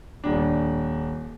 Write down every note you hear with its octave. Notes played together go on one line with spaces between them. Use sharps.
D#1 D4